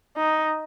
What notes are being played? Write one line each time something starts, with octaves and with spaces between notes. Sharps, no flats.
D#4